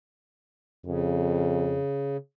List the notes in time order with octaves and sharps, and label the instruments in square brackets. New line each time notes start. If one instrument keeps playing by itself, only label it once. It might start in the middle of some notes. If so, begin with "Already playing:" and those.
[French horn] F2 [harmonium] C#3